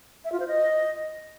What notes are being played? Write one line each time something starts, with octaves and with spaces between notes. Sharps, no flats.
E5
F4
C5
D#5